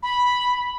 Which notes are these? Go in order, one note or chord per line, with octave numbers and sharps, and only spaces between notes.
B5